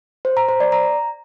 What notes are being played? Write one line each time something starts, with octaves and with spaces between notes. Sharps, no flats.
C5
A#5
C5
D5
A#5